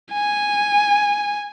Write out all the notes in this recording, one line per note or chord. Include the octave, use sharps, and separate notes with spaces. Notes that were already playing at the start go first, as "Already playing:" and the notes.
G#5